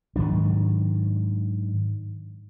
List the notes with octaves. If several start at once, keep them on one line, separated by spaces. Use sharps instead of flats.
G#2 D#3 F#3 D4